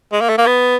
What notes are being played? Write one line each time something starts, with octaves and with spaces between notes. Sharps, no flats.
G#3
A#3
A3
A#3
B3